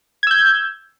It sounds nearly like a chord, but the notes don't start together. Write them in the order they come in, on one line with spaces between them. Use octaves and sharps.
G#6 E6 G6